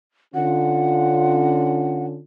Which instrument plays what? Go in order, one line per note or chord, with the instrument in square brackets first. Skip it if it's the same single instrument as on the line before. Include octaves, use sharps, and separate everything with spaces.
[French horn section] D3 C#4 F4 [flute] F#5